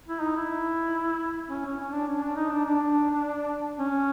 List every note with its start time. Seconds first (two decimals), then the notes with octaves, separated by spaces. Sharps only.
0.08 E4
0.21 D#4
0.37 E4
1.50 C#4
1.65 C#4
1.80 C#4
1.93 D4
2.08 C#4
2.23 D4
2.36 D#4
2.50 D4
2.65 D4
3.79 C#4